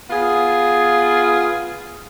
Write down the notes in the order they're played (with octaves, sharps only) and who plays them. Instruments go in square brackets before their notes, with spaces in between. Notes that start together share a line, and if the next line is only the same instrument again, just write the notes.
[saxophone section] B3 F4 G#4